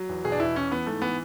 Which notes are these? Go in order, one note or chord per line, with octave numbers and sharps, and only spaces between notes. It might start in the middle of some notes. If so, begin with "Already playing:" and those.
Already playing: F#3
E2
B2 G#4
D4
E2 E4
E3 C#4
E3 B3
G#2 A3
E3 B3